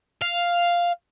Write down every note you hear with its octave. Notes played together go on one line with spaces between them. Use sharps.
F5